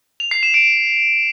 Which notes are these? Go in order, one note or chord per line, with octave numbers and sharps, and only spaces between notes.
F7
C7
E7
D7